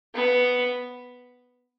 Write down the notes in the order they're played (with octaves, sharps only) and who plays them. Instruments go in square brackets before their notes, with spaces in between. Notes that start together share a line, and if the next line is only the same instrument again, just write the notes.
[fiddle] B3